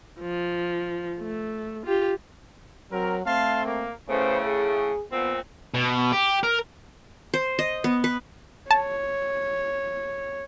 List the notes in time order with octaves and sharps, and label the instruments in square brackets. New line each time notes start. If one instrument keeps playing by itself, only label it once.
[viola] F3
A3
F4 G4
[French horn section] F#3 [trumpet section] C4 A#4
[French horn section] A3 C4 [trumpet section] F5 A5 C6
[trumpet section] A#3
[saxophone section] A2 C#3 [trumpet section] A3 [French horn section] B3 C#4 C5
[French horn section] G#4
[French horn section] F2 B3 [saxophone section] A#2 C4
[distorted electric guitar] B2
G4
A#4
[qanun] C5
D#5
B3
B4
[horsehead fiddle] C#5 [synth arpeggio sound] A5